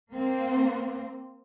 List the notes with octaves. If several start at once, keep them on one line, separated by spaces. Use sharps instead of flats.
A#3 C4